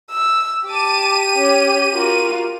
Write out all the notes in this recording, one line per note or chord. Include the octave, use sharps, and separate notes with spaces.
E6
G4 A5 D6 D#7
C#4
F4 F#4 A#4